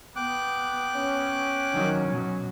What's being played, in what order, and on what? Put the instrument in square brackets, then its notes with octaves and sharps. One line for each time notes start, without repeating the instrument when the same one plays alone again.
[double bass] B3 [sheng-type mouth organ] G5 D6 F#6
[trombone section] C#4
[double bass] D#3 F#3
B2 F#3